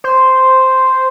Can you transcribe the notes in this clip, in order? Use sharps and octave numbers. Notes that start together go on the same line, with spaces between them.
C5